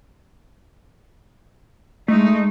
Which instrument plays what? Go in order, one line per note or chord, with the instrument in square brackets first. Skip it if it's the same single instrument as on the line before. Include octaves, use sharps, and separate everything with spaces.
[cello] G#3 D#4 [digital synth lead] A3